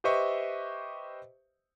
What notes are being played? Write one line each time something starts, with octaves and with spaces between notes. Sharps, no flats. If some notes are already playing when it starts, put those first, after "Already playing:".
G4 B4 C5 D#5 E5 C#6